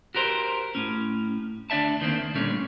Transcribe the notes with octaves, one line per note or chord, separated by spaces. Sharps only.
F#4 G4 A#4 C5
A2 C#4
D2 D4 D5 E5 A5
D#2 D#3 A#3 C4
D2
A#2 G3 A3 C#4 D4